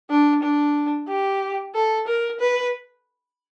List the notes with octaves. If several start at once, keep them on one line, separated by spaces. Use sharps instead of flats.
D4
D4
G4
A4
A#4
B4